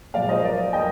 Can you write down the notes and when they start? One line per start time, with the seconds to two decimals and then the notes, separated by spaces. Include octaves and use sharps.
0.14 A#2 F3 G#3 D5 F5
0.29 C5 D#5
0.44 A#4 D5
0.73 D#5 G5